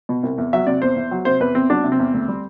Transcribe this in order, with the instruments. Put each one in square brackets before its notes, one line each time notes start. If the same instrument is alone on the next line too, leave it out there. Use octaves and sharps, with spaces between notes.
[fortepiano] B2
C2
E2
F#3 E5
C3 D5
E2 C5
E2
F#3
C3 C5
E2 B4
E2 C4
F#3 D4
C3
C4
E2
D2
G3